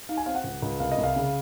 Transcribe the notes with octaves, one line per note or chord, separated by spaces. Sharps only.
D#4 F5
G#5
C4 F5
F#5
C#2
C#2
C2 F5
D#5
C2
F5
C#3